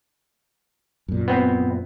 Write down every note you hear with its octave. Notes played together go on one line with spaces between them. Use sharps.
F#2 A#2
B3 C4